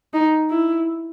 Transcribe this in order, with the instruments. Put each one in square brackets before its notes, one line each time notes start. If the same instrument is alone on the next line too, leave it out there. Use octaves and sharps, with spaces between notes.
[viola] D#4
E4